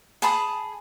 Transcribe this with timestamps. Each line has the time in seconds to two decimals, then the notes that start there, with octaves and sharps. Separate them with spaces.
0.22 G#4 A5 B5 D#6